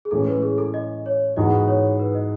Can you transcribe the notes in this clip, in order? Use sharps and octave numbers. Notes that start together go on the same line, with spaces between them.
G#4
A2 E3 G#3 C#4 A4
B4
G#4
A4
D#5
C#5
G#2 E3 B3 F#4 D#5
C#5
B4
D#5